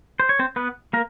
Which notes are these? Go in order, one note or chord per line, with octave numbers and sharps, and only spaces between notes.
C5
C#5
C4 C5
B3 B4
A#3 A#4